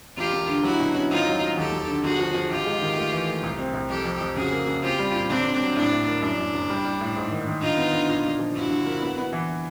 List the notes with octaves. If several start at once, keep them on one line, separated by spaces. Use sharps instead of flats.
E1 F4 G4
E1
D3
F#3 E4 F#4
B2
C#4
G#1 D#4 F4
F#3
F#3
D#2 G4 A4
D#2
D3
G1 F#4 G#4
F3
F3
G#1 F4 G4
G#3
D#3
A3
E3
A3
C2
C4
C2
F2 G4 A4
F2
F2
C#3 F#4 G#4
A#3
C#3
C4 F4 G4
G3
A#2
G1 C4 D4
D3
F#3
A2 D4 E4
A2
A#3
F#2 D4 E4
F#2
F#1
G3
G3
A2
G#2
D#3
D#3
D3 D#4 F4
B3
D3
A#2
A#2
F3
G2 E4 F#4
D3
A#3
B3
B3
E3